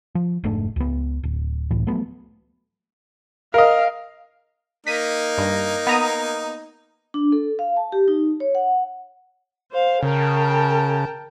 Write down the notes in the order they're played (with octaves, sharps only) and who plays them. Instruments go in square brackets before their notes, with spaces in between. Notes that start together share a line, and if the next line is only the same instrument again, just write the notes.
[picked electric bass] F3
F1 G#2 A3 D4
C#2 B3
D1
F#1 C#2 A2 E3
F3 F#3 A3 B3
[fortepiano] A#4 D#5 [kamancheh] F5
[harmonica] A#3 D#4 [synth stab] B6 D#7
[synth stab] G2
B3 A#5 D#6
[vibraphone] D4
A4
F5
A5
G4
D#4
C#5
F#5
[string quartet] C5 F5
[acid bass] C#3 [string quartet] A#4 G5 A5